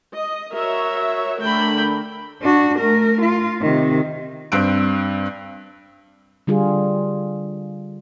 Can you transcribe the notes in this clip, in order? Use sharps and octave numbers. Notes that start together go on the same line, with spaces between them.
D#5
F#4 A#4 C#5 E5
D3 A3 A#4 G5 B5
D4 F#4
A3 A#4
F4
C3 D#3
G2 C4 E6 F#6 D7
D3 G3 F4 G#4